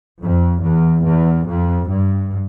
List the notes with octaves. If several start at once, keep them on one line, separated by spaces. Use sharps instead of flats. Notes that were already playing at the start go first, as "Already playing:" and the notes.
F2
E2
E2
F2
G2